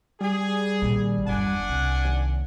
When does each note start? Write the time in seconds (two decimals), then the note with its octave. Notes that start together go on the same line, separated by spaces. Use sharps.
0.21 G3 G#4
0.82 A#1 D#3
1.26 G1 E2 D4 F#5 G#5
1.69 C2
2.04 D#2